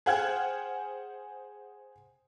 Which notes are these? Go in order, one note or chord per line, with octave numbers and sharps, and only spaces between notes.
G#4 C5 F#5 G5 F6 G#6